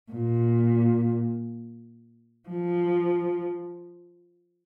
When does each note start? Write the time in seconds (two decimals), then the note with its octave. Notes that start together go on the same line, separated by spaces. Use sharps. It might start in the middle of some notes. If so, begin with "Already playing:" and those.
0.12 A#2
2.49 F3